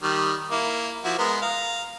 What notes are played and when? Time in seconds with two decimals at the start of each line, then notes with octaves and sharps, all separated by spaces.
0.03 D#3 G3
0.51 A#3 E4
1.04 F3 E4 F#4
1.18 G#3 B3 A#4
1.42 F5 A#5